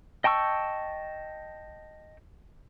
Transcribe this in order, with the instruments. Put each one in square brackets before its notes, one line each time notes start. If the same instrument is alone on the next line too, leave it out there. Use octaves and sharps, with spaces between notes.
[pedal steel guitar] D#5 G5 A5 C#6 E6